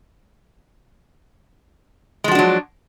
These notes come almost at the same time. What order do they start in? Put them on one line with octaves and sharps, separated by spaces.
G#3 F3 F#4 D4 F#3